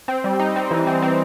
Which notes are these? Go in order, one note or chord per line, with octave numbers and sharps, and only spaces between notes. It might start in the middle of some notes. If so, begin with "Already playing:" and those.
C4
G3
D#4
C4
E3
C4
C4